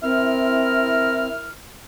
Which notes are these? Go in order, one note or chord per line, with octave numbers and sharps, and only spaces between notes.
C4 E4 A#4 F6